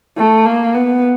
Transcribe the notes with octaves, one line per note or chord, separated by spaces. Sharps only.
A3
A#3
B3